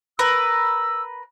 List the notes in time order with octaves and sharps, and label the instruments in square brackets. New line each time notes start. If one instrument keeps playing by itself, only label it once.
[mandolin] A#4 B4 [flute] E6